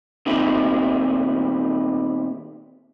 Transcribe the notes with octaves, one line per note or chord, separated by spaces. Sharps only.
A#2 D#3 B3 C4 D#4 E4